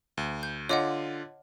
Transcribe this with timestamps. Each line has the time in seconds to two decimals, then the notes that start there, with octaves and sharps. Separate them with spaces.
0.17 D2
0.43 G6
0.69 D3 F4 C#5 D#5 F#5 D6